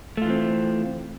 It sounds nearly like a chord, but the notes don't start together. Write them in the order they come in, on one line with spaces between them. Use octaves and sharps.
A3 F4 E3 C4